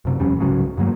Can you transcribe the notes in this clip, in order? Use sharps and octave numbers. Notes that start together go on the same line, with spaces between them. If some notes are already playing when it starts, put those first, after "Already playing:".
F#2 C3
D#1 F2 G3 C#4
C2 G#2 C#3 F#3
G2 D#3 F#3 A#3